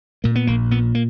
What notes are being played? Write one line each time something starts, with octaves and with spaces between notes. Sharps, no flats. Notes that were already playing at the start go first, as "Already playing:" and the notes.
A#2 A#3
B3
A#1 A#3
A#2 B3
A#3